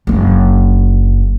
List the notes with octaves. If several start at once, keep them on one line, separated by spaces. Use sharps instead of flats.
F#1 D4